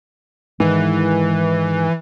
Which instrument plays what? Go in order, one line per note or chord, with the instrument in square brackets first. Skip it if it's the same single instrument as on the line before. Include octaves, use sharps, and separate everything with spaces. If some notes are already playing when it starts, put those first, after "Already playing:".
[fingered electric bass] G#2 D#3 G#3 [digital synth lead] E3